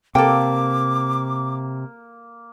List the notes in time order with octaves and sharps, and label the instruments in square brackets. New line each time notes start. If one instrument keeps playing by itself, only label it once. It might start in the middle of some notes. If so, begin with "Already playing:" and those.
[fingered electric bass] C3 [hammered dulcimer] A#3 [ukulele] A4 G5 [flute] D6